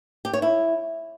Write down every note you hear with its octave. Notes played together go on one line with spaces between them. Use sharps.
G4
C#5
E4